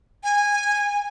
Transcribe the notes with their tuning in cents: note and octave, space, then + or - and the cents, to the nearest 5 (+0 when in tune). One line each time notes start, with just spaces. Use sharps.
G#5 -15